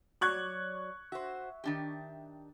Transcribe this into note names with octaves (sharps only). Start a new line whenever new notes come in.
F#3 C#5 D5 C#6 F#6 G#6
F#4 C5 E5
D#3 D4 G4